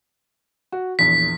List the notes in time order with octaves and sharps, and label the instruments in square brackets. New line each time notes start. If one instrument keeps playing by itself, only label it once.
[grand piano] F#4
[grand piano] A#1 E2 [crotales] B6